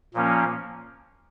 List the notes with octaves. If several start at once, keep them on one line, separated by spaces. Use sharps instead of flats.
A#2 F3 A#3 C#4